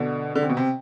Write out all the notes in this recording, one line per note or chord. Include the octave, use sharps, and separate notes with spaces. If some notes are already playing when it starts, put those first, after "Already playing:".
Already playing: B2 D3
D3
C3
B2
C3